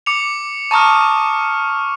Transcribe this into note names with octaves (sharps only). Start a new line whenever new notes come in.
D6 C#7 F7
A5 A#5 C#6 D#6 F6